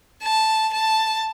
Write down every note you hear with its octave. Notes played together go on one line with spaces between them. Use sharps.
A5
A5